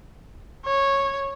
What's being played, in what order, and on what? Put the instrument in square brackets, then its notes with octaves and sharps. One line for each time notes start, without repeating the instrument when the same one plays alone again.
[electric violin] C#5